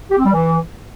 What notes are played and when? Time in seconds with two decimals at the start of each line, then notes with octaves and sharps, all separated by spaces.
0.11 G4
0.18 C4
0.26 G3
0.33 E3